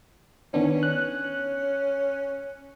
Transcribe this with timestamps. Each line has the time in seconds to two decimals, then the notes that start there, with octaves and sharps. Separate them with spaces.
0.54 D#3 B3 C#4 D4
0.83 F#6